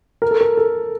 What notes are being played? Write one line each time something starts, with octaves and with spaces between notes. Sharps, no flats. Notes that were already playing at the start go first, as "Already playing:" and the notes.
A#4
A4
A#4
A4